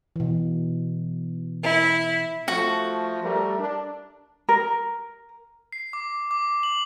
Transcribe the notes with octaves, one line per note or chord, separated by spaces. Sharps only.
B2 E3
E4
F3 A3 F#4
G3 A3 A#4
D4
A#4
C7
D6
D6
F#7